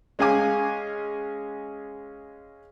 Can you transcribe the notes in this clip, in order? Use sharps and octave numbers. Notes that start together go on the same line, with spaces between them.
G#3 C#4 G#4 F5 G#5 D6